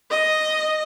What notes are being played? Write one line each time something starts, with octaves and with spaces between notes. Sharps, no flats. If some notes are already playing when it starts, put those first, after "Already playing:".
D#5